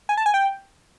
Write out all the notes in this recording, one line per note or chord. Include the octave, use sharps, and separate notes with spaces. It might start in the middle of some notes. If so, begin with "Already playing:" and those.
G#5
A5
G#5
G5